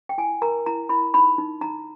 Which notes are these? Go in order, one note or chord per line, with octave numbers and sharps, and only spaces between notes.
G5
E4 G#5
A#4 A#5
E4 A#5
E4 B5
D#4 B5
D#4
D#4 A#5